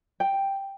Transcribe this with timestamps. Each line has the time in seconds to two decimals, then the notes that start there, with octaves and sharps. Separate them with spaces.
0.20 G5